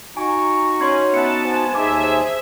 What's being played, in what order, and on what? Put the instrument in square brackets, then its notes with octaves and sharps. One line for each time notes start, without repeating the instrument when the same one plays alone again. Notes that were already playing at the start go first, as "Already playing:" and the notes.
[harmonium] D#4 F#4 [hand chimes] G#5 [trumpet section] A#5 C#6
[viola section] C#4 [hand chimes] C#5 C6 G#6
[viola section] B3 A5 [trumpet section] B4 E5 F#5 [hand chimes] C#7
[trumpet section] F4 G#5 [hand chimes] C5
[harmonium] D#2 D#4 A5 [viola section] G#4 E5 [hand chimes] D6
[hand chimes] C5